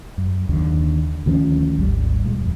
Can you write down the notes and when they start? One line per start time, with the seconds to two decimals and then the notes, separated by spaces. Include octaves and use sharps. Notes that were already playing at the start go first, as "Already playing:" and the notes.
0.18 F#2
0.49 D#2 D3
1.26 D2 D#3 F3 C#4
1.78 G#1 D2 G#2 G3
2.25 A#2 G#3
2.38 D#1 F2